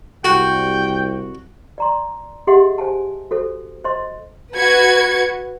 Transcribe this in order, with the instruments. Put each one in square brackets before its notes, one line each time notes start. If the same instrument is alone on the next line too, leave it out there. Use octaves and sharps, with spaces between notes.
[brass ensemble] C2 [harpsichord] F#4 [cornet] G5
[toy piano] D5 A#5 C6
G4 G#4 D#5 E5 F#5 C6
C5 G#5 A5
F#4 A4 C5
C5 D#5 C6
[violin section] F#4 B4 G#6 C#7